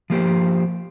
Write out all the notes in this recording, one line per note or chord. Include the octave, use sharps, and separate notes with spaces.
F3 A#3 G4 C5